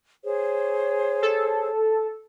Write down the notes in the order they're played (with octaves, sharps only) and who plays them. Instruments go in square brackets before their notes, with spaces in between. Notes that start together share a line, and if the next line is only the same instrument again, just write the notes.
[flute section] G#4 C5 C#5
[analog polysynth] A4